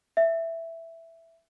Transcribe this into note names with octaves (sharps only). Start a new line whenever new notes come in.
E5